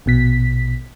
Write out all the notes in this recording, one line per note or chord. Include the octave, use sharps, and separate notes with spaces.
A#1 B2 B6